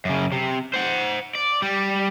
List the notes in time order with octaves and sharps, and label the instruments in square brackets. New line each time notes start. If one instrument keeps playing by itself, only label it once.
[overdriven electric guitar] F#2 C#3
C3
C5 F#5
D5
G3